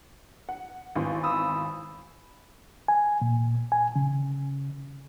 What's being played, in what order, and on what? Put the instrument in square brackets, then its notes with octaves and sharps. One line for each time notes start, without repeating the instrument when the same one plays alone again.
[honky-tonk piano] F#5
G#1 E2 C6
[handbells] B5 D#6 E6
[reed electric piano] G#5
A#2
G#5
C#3